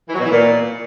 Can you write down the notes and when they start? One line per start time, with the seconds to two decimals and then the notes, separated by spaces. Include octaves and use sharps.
0.08 E3
0.14 F#3
0.19 B2
0.25 E3
0.30 A#2